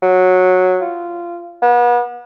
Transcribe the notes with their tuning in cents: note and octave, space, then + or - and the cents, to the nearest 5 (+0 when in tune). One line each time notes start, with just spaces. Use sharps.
F#3 -10
F4 -15
B3 -35